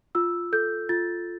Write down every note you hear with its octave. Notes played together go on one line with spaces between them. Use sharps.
F4 E6
A4 G6
F4 A6